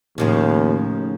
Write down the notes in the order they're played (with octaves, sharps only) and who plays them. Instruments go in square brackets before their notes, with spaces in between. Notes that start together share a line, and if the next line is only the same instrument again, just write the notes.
[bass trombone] D#2 [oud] A2 C#3 F3